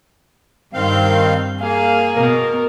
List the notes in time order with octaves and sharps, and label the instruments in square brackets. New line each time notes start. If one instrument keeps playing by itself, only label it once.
[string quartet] G2 G6 [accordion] D#3 C4 F5
[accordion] A#3 [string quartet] G#4 [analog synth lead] F5
[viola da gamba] B2 [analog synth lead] A#4